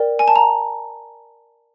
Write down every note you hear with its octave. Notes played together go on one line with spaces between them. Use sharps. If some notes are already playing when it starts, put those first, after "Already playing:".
Already playing: A#4 D5 G5
G#5
A5
A#5